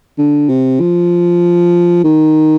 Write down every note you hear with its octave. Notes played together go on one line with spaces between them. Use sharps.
D3
C3
F3
D#3